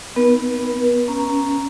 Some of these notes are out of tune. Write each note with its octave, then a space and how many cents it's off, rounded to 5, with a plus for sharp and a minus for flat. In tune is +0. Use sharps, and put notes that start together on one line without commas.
B3 +0 D#4 +0 B4 -40
C#4 +0 A#5 +0